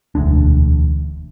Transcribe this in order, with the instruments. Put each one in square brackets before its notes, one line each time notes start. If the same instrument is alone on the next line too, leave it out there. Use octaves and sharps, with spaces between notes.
[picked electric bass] E1 D2 G#3 D4